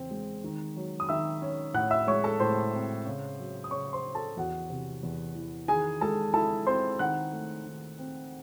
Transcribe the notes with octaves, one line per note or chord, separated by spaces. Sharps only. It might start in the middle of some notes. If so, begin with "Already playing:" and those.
Already playing: E2 C#3 C4
G#3
D#3
F#3
D#6
D#3 E5 E6
C#4
A2 F#5 F#6
E5 E6
G#3 C#5 C#6
A4 A5
A2 C5 C6
C4
C#3
F#3
D#6
C#3 C#5 C#6
C5 C6
C#4
A4 A5
E2 F#4 F#5
C3
E2
E3
D#3 G#4 G#5
G#3 A4 A5
E4 A4 A5
C4 C5 C6
D#3 F#5 F#6
A3
D#3
C4